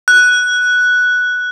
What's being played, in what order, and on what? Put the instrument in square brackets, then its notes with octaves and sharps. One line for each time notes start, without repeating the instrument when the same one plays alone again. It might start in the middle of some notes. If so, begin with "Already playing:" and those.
[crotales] F#6